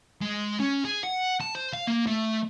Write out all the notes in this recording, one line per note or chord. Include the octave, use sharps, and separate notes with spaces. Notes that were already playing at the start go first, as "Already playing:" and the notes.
G#3
C#4
G#4
F#5
A5
C5
F5
A#3
A3